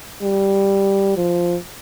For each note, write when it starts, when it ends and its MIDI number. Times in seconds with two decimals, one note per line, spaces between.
0.22 1.14 55
1.17 1.57 53